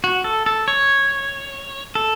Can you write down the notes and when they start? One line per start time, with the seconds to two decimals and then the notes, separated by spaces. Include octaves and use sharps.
0.04 F#4
0.24 A4
0.46 A4
0.68 C#5
1.95 A4